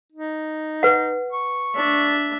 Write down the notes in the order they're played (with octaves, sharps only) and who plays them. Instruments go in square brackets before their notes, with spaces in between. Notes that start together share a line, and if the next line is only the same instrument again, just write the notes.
[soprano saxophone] D#4
[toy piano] B4 F#5
[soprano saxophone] C#6
[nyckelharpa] D4 E5